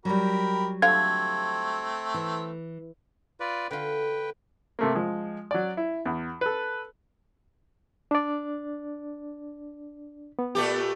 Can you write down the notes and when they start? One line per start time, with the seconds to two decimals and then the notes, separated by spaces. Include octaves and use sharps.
0.05 F#3 G3 G4 A#4 B5
0.82 D3 F3 A3 C4 F5 G#6
2.14 E3
3.40 F4 B4 D5
3.71 D3 F4 B4 G5
4.79 C3 A3 A#3
4.95 F3 G#3
5.51 F#3 D5
5.77 E4
6.05 E2
6.41 A4 B4
8.11 D4 D5
10.39 B3
10.55 A#2 A3 G4